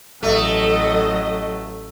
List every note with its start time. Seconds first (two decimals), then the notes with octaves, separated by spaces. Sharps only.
0.23 A1 F#3 A3 A4 D#5